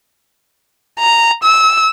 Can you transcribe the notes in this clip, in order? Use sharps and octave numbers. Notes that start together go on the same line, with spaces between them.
A#5
E6